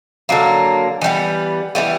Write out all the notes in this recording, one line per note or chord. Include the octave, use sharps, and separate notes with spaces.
D3 F#3 A#3
E3 G3 B3
E3 G3 B3